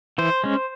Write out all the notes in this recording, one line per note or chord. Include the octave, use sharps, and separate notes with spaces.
E3 C5
G#3 C#4